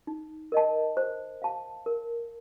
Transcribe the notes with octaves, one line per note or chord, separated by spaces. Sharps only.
D#4
A#4 D#5 A5
C5
F5 A5
A#4